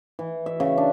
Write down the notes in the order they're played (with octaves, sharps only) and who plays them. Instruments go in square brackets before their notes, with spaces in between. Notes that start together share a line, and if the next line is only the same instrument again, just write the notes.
[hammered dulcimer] E3
E5
C#3
D4